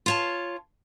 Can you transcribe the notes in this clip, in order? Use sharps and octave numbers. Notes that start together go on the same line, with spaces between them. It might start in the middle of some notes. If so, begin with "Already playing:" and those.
F4 C#5 A5